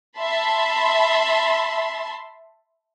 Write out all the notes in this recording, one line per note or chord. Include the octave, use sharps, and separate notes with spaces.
E5 A5 B5 C6